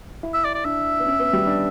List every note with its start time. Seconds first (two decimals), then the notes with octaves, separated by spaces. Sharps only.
0.23 E4
0.34 E5
0.44 D5
0.54 D5
0.65 D4 E5
1.00 B3
1.06 C#4
1.20 B3
1.33 G3
1.47 D4